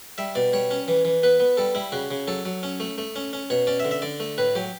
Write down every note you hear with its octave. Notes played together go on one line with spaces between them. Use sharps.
G3 E5
B2 D5
G3 C#5
C#4
E3
E3
B3 B4
B3
G3 A4
G3 E4
C#3 F#4
C#3
F#3 A4
F#3
C#4
A3
A3
C#4
C#4
B2 C#5
C#4 D5
E5
D3
E5
D3 D5
A3
A2 B4
F#3 G4